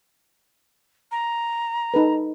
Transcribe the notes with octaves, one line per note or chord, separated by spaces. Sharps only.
A#5
D#4 A4 B4